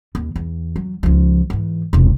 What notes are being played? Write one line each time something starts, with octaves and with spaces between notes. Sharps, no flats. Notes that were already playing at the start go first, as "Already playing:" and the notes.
D#2
E2
F#3
C#2 F3
G#2 E3
E1 C2